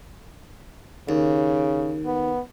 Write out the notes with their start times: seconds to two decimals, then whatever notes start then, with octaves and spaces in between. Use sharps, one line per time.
1.09 D#2 C#3
2.05 B3